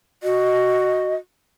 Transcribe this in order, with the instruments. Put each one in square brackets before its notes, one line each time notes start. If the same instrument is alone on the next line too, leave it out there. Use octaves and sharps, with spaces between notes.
[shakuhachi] F#4 [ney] D#5